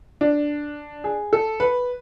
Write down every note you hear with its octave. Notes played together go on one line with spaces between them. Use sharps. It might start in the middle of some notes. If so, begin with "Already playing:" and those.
D4
G#4
A4
B4